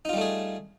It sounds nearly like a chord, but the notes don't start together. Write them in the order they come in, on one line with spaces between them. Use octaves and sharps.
D#4 F4 G3 A3 G#4